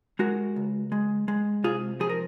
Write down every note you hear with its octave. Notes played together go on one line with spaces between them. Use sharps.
G#3 F#4 A#4
C#2
G#3
G#3
C3 F4 G#4
F3 G#4
A#4